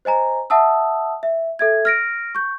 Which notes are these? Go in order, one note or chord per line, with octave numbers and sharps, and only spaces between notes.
C5 D#5 G#5 A#5
E5 F#5 A5 D#6 E6
E5
A4 E5 G#6
F6 A#6 D7
C#6 G6